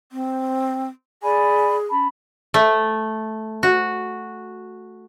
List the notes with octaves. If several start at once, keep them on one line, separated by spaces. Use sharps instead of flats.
C4
G#4 D5 G#5 B5
C#4 A5 B5
A3
F#4